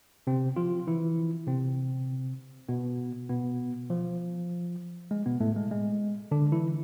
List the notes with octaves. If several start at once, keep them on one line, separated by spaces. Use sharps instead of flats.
C3 C4
F3 F4
E3 E4
C3 C4
B2 B3
B2 B3
F3
G#3
B2 B3
A2 A3
G#3
G#3
D3 D4
E3 E4